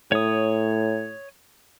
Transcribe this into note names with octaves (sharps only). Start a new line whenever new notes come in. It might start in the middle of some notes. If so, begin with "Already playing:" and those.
A2 C#5 D#6